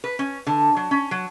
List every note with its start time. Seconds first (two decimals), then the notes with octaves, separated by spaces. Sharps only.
0.04 B4
0.19 C#4
0.47 D3
0.76 F#3
0.91 C#4
1.11 F#3